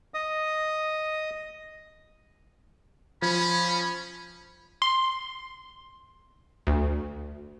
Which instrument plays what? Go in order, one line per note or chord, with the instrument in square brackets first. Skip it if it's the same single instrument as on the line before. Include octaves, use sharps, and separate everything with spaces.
[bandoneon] D#5 D#6
[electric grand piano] F3 G#6 [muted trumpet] C#4 [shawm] B5
[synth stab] C6
D2